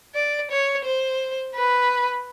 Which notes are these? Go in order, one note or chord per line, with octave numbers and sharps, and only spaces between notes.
D5
C#5
C5
B4